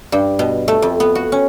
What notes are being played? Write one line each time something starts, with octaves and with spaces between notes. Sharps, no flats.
G2
B2
A3
F2
B3
F#4
C#4